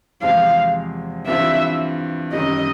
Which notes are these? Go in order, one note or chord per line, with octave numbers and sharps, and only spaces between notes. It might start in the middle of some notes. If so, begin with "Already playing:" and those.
E2 C3 F3 G#3 C4 F5
G2 E3 G3 C4 F4 E5
F#2 D#3 G3 D#5